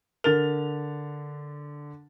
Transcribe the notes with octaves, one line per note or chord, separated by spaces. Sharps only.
D3 A#4 A6 F7